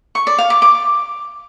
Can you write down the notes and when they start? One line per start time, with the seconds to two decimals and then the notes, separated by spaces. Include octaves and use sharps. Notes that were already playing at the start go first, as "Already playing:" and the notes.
0.15 C#6
0.27 D5
0.38 F5
0.50 D6
0.62 D6